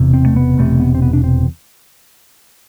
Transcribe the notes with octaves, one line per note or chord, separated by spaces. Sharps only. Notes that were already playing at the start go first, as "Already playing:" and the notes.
Already playing: E1 E2 C3
C4
A3
B3
E1 E2 C3 A3
B3
C4
B3
D4
C4